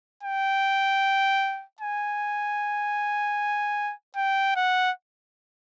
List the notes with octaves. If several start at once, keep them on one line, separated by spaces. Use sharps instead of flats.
G5
G#5
G5
F#5